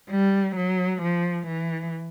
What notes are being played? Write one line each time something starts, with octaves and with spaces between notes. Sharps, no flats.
G3
F#3
F3
E3